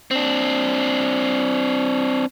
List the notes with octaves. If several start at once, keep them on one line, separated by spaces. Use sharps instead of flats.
C4 D4